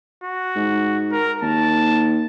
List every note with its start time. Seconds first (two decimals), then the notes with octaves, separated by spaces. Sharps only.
0.24 F#4
0.56 G#2
1.12 A#4
1.42 D#2 A5